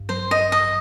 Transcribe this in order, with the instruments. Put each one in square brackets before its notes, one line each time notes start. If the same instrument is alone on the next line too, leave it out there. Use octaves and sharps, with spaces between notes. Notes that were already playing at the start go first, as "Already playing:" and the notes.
Already playing: [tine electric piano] A1 G2
[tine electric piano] F#3 [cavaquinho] C5
[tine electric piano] A1 [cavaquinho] D#5
[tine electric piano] A1 [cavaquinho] D#5